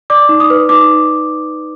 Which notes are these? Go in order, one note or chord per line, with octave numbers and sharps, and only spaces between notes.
D5 D6
D#4
D#6
B4
D#4 D6